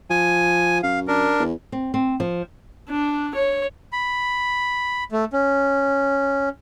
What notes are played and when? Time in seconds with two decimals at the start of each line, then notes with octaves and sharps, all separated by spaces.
0.10 F3 G#5
0.83 F#2 F5
1.08 D4 A#4
1.39 E2
1.72 C4
1.94 C4
2.20 F3
2.89 D4
3.35 C#5
3.93 B5
5.12 A3
5.33 C#4